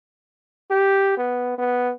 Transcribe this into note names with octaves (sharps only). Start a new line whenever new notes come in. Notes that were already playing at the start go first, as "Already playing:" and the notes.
G4
B3
B3